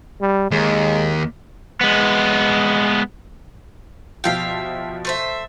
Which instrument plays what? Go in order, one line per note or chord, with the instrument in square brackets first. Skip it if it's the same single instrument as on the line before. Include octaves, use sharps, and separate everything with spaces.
[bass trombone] G3
[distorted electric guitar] D#2 [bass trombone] G#3
[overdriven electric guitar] G#3 B3
[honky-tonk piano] B2 F3 F4 [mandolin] G4 E5 F5
[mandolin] A3 C5 E5